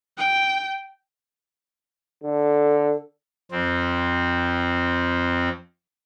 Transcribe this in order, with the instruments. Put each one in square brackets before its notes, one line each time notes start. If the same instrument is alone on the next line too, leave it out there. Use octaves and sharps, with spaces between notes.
[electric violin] G5
[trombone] D3 [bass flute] A4
[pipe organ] F2 C4